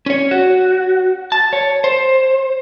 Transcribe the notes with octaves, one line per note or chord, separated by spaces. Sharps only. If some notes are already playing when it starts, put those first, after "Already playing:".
C#4 C#5
F#4
A5
C#5
C5